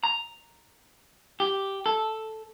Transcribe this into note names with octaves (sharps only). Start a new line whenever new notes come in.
A#5
G4
A4